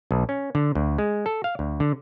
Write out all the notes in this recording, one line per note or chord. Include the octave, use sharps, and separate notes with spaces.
B1
C#4
D3
D2
G#3
A4
F5
D2
D3